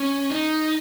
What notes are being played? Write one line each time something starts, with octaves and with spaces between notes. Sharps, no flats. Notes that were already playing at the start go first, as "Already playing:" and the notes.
Already playing: C#4
D#4